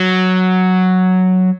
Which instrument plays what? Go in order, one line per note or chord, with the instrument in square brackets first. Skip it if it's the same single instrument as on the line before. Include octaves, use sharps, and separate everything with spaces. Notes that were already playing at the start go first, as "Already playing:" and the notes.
Already playing: [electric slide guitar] F#3